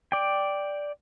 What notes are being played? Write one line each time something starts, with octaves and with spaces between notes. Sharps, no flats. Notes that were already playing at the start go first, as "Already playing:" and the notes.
D5 G5